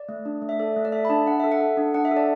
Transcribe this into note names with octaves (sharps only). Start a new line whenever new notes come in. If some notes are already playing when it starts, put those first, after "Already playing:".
Already playing: D5
A3
D4
A3
E5
A4 D5
A3
D5
A4 E5
B5
D4 A5
D4 F#5
A4 E5
F#5
A4
D4
D4 F#5
E5
A4
D5